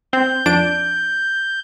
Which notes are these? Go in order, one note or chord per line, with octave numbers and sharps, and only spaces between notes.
C4 G6
F2 D4 D7